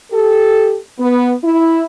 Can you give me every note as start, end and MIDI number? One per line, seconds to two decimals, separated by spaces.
0.11 0.76 67
0.11 0.76 69
0.99 1.34 59
1.44 1.84 64